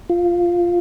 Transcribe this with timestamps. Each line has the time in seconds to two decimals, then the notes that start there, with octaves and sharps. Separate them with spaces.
0.10 F4